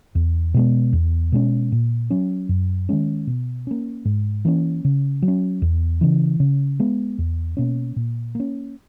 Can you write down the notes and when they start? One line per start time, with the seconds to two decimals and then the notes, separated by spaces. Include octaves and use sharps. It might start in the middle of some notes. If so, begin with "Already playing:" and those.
0.15 E2
0.54 B2 G#3 B3
0.93 E2
1.32 B2 G#3 C#4
1.72 A#2
2.10 F#3 C#4
2.49 F#2
2.89 D#3 G#3 C#4
3.27 B2
3.67 A#3 C#4
4.05 G#2
4.45 E3 A#3 C#4
4.85 C#3
5.22 F#3
5.28 C#4
5.62 E2
6.01 C#3 E3
6.40 C#3
6.80 G#3 B3
7.19 E2
7.57 B2 A#3 C#4
7.96 A#2
8.35 A#3 C#4